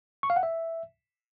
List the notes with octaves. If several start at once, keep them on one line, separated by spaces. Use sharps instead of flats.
C#6
F5
F#5
E5